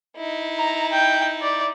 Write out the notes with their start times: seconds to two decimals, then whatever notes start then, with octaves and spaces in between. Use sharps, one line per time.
0.17 D#4 E4
0.59 A#5
0.92 G5
1.42 D5